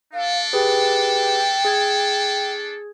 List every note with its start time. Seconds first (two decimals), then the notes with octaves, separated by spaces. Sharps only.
0.14 D4 A4 F5
0.53 G4 G#4 B4 G5
1.65 G#4 G#6